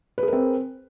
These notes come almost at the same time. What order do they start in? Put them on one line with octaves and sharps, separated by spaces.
B4 G#4 A#4 C4